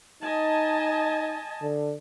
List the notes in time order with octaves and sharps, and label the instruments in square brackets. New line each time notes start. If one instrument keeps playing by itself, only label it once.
[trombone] D#4 [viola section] D#5 G#5 A5
[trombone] D3